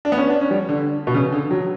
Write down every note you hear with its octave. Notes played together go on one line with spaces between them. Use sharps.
D4
B3
C#4
D4
C#4
G3
D3
B2
C#3
D3
F#3